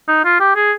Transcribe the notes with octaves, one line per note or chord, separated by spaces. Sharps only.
D#4
F4
G4
G#4